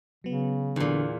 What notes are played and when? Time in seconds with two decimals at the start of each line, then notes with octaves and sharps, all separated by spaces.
0.24 C#3 F#3 B3
0.76 E2 A#2 D3